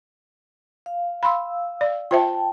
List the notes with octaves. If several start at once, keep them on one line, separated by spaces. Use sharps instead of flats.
F5
F5 B5 C6 E6
D5
F4 C5 E5 G5 A5